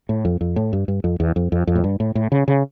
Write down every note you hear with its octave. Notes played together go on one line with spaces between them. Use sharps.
A2
F2
F2
A2
G2
G2
F2
E2
F2
F2
F2
A2
G2
A2
A2
C#3
C#3